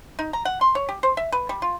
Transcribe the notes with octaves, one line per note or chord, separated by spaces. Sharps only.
D#4
A#5
F#5
C6
C#5
G4
C5
E5
B4
G3
F4